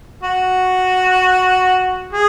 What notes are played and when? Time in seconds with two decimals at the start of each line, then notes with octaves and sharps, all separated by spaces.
0.23 F#4
2.13 G#4